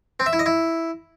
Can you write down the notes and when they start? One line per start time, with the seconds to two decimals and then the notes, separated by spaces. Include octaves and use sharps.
0.20 C4
0.26 E5
0.33 E4
0.39 D#5
0.46 E4